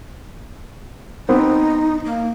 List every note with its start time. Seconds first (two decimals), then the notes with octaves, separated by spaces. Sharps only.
1.29 B3 C4 D#4
2.06 A#3